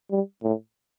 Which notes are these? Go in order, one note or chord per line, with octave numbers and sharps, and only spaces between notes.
G3
A2